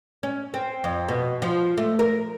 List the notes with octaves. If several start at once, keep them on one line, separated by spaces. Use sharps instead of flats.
C#4
C4
F2
B2
F3
A3
A#4